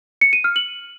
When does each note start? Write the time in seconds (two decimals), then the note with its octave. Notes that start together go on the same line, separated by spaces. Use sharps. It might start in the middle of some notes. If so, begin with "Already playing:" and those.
0.21 C#7
0.33 D#7
0.44 F6
0.56 F#7